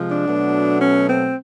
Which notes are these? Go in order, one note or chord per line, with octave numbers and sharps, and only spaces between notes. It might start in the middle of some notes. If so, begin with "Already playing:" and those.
Already playing: C3 F3 G#3
D4
B2 F#3 A3
C#4
C4